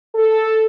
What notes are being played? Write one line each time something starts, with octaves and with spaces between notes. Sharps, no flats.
A4